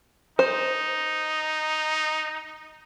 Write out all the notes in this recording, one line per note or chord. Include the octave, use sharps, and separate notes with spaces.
D#4 C5